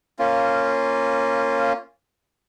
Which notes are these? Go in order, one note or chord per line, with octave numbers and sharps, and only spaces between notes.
A#3 C#4 F4